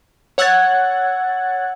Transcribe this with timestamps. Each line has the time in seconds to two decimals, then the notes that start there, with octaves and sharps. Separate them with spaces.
0.38 C#5 F#5 E6 F#6 G#6 A6